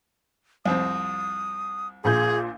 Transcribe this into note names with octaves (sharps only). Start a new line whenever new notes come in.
C2 F2 C4 D#6
A#1 A#2 G#4 G6